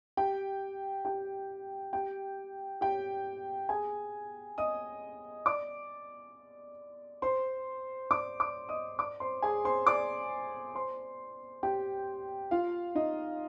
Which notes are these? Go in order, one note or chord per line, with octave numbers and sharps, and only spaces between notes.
G4 G5
G4 G5
G4 G5
G4 G5
G#4 G#5
D#5 D#6
D5 D6
C5 C6
D5 D6
D5 D6
D#5 D#6
D5 D6
C5 C6
G#4 G#5
C5 C6
D5 D6
C5 C6
G4 G5
F4 F5
D#4 D#5